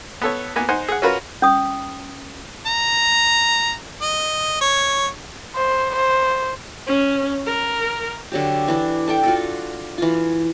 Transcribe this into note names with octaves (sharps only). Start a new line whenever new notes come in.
B3 A4 C#5
A#3 B3 G#5
D#4 C5 F#5 G#5
G#4 F#5
C#4 F4 F#4 A#4 B4
C#4 D#6
A#5
D#5
C#5
C5
C5
C#4
A#4
D3 F#3 G4
E3 D4
D4 A4 G5
F4 F#4 A4
E3 F4